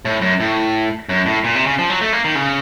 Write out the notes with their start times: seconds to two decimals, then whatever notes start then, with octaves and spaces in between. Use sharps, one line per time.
0.05 A2
0.21 F#2
0.40 A2
1.09 F#2
1.26 A2
1.44 A#2
1.55 C3
1.66 C#3
1.79 F3
1.90 F#3
2.01 A3
2.13 A#3
2.24 D#3
2.35 C#3